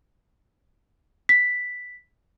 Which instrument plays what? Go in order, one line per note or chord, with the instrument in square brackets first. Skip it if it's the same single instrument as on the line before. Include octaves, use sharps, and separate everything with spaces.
[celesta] B6